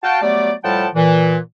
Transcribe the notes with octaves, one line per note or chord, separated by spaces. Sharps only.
F#4 F5 G5 A5
F#3 G3 A3 B3 D5
A2 F3 G3 F#5 G5 A5
A#2 E3